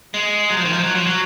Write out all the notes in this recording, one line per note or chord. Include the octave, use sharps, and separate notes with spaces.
G#3
F#3
F3
D#3
F3
F#3
F3
F#3